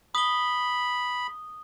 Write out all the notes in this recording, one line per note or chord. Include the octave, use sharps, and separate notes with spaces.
B5 D#6 G7